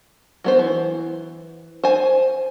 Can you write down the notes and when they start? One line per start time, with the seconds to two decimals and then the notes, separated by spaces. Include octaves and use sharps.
0.44 F#3 B3 C5
0.59 E3
1.83 C5 G#5